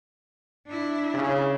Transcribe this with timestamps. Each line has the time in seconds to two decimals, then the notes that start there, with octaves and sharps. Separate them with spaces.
0.66 D4 E4
1.14 C#3